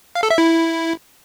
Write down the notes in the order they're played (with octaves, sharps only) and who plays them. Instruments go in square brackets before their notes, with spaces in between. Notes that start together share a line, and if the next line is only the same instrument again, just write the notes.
[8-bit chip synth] F5
A4
E5
E4